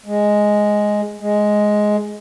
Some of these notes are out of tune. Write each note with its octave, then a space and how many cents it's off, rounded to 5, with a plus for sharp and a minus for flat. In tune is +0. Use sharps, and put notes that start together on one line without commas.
G#3 +0
G#3 +5